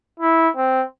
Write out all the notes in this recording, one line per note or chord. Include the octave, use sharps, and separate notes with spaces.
E4
C4